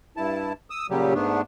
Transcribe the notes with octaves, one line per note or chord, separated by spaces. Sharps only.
G2 E4 A5
D#6 E6
A#2 C#3 F#3 G3 G4
G#2 A3 B3 D4